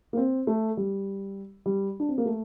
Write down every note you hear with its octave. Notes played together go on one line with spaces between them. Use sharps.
A#3
C4
A3
G3
G3
D4
C4
A#3
A3